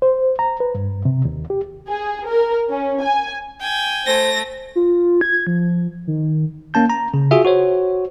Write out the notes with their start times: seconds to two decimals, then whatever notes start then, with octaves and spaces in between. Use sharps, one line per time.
0.02 C5
0.39 A#5
0.60 B4
0.75 G2
1.05 C3
1.25 D#2
1.50 G4
1.88 G#4
2.26 A#4
2.70 C#4
3.02 G#5
3.60 G5 G#5
4.06 A3 C5 A#6
4.75 F4
5.21 G#6
5.47 F3
6.07 D#3
6.74 A#3 C#4 A5 G6
6.90 A#5
7.14 C#3
7.31 F4 F#4 G#4 E5
7.44 F#4 C5 C#5